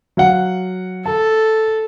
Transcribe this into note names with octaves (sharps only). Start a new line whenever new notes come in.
F#3 F5 F#5
A4 A5